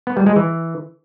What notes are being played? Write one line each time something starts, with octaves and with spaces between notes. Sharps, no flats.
B3
G3
G#3
E3